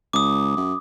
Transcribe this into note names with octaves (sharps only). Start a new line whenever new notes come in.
C#2 D6 D#6
F#2